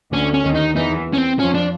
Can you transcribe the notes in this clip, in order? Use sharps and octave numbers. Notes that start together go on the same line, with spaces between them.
D2 D3 C#4
C#4
D#2 D#3
D#4
E2 E3 D#4
C#4
C4
F2 F3 C#4
D4